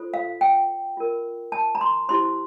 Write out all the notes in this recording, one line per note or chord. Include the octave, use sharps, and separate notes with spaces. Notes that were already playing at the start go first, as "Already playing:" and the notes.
Already playing: F4 A4 C5
F5
G5
F4 A#4
A5
A#5
C6
E4 G4 C5 C6